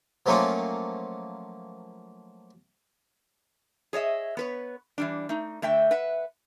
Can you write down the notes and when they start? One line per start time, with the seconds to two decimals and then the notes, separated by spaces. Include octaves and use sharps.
0.26 F3 F#3 A3 A#3 C#4 F4
3.93 G#4 C#5 D#5 E5
4.37 B3 B4 C#5
4.98 E3 G3 D4
5.29 A3 D#4
5.62 D3 A3 E5 G5
5.91 B4 E5 F#5